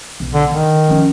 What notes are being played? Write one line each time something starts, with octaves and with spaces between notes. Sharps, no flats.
B1
D3
D3 D#3
F3 C#4